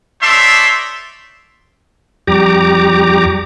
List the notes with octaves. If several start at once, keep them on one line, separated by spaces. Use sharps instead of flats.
D#4 A4 C#5 D5 E5 C6
F2 G3 G4 A#5 D6